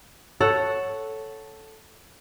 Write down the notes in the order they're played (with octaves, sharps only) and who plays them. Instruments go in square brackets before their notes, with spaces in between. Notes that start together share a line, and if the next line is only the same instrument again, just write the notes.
[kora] A4 C#5 F#5